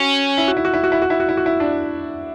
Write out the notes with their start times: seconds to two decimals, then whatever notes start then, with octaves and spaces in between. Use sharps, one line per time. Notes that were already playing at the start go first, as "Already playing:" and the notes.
Already playing: C#4 F#4
0.37 E4
0.48 F#4
0.57 E4
0.65 F#4
0.74 E4
0.83 F#4
0.92 E4
1.02 F#4
1.10 E4
1.20 F#4
1.29 E4
1.37 F#4
1.46 E4
1.60 D4